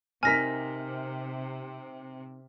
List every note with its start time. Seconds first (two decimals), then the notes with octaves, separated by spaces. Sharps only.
0.23 C3 C4 D#4 A#4 G#5 F6 A#6 B6